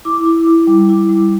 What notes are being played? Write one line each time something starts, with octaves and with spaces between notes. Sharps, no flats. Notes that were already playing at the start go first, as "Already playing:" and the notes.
E4 D6
E4
E4
G3
E4
G3